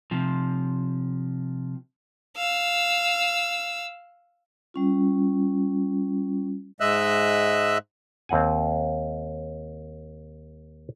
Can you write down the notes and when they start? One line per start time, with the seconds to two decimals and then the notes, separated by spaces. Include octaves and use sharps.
0.11 C3 F3
2.37 F5 E6
4.74 G3 C#4 F4
6.80 G#2 G#3 D#5 E5 E6 F#6
8.29 D#2 C4 F#5 G#5